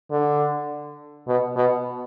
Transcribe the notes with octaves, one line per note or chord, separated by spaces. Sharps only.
D3
B2
B2